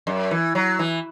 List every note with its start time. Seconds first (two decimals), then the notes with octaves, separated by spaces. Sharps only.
0.07 F#2
0.31 E3
0.55 F#3
0.79 E3